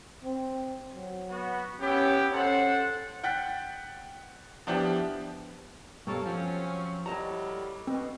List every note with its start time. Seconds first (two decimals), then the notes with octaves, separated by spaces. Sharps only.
0.24 C4
0.95 F#3
1.29 B3 F#4
1.80 B3 C#4 E4 G4
2.31 C#4 A4 C5 F#5
3.23 F#5 G5 F#6 A6 B6
4.67 F3 B3 D4 E4 G4
6.07 G2 B2 A#3 A4 C#5
6.25 F3 F#3 C4 C#4
7.06 A2 F#3 G3 D#5 A5 A#5
7.87 B2 C4